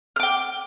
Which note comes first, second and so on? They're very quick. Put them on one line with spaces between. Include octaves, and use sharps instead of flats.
F6 D6 G5